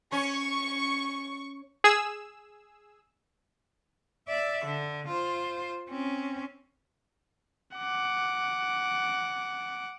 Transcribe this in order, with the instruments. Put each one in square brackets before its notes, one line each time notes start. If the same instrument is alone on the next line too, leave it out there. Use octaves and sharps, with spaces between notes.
[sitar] C#4 [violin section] C#6
[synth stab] G#4 E6
[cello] D5 E5
D3
F4 C5
C4 C#4
[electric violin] F#5 D6